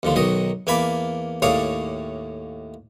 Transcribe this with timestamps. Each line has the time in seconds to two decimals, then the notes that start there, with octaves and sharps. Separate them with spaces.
0.03 D#2 D3 F3
0.16 B1 D#3 F#3 D#5
0.67 E2 A#3 G#5 A5 B5 D6
1.42 D#2 A2 G#4 C#5 D5 F5